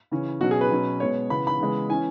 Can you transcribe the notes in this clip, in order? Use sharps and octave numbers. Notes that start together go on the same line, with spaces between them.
C#3 E3 C#4
B2 F#3 C#4 F#4
G#4
B4
B2 F#3 C#4
B2 G#3 B3 C#5
C#3 E3 B3 B5
B5
C#3 E3 G#3 B3
E3 C#4 G#5